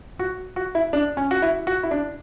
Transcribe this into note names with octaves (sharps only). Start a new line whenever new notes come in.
F#4
F#4
E4
D4
C#4
F#4
E4
F#4
E4
D4